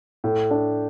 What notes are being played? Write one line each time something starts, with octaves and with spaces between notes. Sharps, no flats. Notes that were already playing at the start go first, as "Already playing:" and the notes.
A2
D4